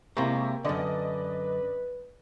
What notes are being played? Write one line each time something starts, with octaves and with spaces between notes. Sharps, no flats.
C3 G#3 A#3 E4 G4 C#6
F#2 D3 B4 D5 D#5